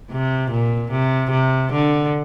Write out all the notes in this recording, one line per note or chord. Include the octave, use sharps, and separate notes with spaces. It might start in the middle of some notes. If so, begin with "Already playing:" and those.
C3
A#2
C3
C3
D3